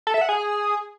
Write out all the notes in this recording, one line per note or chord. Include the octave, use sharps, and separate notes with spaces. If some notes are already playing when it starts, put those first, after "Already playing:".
A4
E5
F#5
G#4